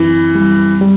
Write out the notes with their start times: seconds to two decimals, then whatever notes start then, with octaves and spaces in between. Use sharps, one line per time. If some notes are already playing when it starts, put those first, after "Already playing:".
Already playing: F#2 E3 C4
0.35 G3
0.81 G3